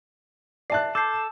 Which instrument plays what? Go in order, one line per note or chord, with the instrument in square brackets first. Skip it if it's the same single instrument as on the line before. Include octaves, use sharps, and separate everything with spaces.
[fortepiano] D5 A5 F#6 [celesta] E5 C7
[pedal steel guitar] A4 [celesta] D6 G6 C7